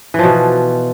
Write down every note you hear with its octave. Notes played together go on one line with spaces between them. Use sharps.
B2 E3 F3